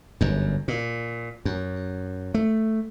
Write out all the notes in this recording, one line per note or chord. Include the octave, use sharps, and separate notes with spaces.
G1 F#2
A#2
F#2
A3